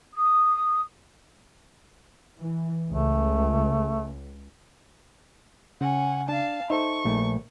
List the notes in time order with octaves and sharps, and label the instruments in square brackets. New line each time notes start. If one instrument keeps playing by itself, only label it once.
[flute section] D#6
[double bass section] E3
[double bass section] C#2 [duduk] A3
[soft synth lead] C#3 [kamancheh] C#4 F#5
[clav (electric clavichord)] D4 [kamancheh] F5 A5
[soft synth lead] D#4 [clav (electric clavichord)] A4 C5 E5 [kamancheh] C#6
[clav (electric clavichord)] A#1 A3